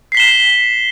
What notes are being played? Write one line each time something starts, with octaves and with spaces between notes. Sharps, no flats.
B6 C7 E7 G7